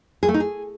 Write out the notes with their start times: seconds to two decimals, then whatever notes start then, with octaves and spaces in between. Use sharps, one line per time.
0.23 G#4
0.28 A3
0.34 D#4
0.40 G#4